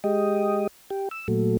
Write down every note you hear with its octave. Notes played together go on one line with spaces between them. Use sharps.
G#3 G4 D#5
G4
E6
A#2 F#3 A3